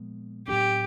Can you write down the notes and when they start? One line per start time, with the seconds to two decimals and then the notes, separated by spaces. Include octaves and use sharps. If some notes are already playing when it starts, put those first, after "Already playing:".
Already playing: A#2 F3 G#3 B3
0.48 A2 F#3 B3 D4 G4